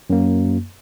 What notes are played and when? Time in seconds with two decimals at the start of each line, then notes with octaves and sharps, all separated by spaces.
0.10 F#2 A#3